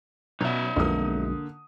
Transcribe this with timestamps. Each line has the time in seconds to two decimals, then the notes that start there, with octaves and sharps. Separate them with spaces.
0.41 B2 F#3 D#4 E5
0.76 B1 F2 D3 G#3 A#3 D#6